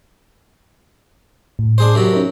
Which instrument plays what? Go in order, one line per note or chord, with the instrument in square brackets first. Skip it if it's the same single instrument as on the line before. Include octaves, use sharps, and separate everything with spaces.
[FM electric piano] A2
[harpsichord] D4 G#4 C5
F#2 C3 F#3
[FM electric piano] C#4 D#4 A#4